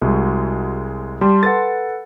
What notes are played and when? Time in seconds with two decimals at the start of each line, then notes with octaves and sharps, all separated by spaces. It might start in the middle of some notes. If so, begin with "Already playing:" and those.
0.02 C2 G#3 F#4
1.21 G3 A5 C6
1.43 A4 B4 F#5 A6